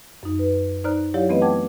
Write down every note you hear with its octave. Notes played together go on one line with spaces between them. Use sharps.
F#2 D#4
B4
D#4 C5 D5 A#5 F6 F#6
F#3 E4 G4 C#5 D5 F5
E3 A3 B3 C4 B4 D#5
F#5 G5 A5 D6 G#6